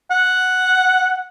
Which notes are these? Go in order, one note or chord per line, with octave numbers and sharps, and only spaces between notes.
F#5